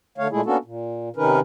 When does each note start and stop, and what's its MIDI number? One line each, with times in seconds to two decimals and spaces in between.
0.18 0.28 50
0.18 0.28 57
0.18 0.28 73
0.18 0.28 77
0.31 0.41 46
0.31 0.41 56
0.31 0.41 57
0.31 0.41 64
0.31 0.41 68
0.46 0.57 58
0.46 0.57 59
0.46 0.57 61
0.46 0.57 62
0.46 0.57 66
0.46 0.57 69
0.65 1.09 46
1.16 1.40 48
1.16 1.40 51
1.16 1.40 61
1.16 1.40 63
1.16 1.40 70
1.16 1.40 71